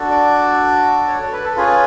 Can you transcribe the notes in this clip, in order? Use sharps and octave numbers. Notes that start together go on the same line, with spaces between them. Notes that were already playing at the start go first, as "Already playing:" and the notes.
Already playing: D4 F#4 A4
D5
C#5
A4
B4
A4
C#4 F4 G#4 B4